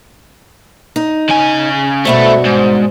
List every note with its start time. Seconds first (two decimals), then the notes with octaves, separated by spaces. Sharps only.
0.96 D#4
1.29 C#3 G#5
2.05 G2 B2 A3 F#4 C5 E5 B5
2.45 G#2 C5